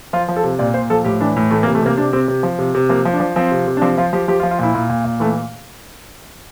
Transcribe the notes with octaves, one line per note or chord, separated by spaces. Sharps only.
F3 F4
F3
A4
C3
A#2 D5
A#2 C5
F3 A4
A2 G4
E3 D4
A2
E3 A3
A#3
C3
A3
C3 A#3
C3 D4
C3 C4
C3
F3
C3
C3
F3 A#3
F3
D4
F3
F3 C4
C3
C3
D4
F3 C4
F3 F4
F3 G4
F3 G4
F4
F3
F4
A#2 E4
A#2
A#2
A#2
E3 A3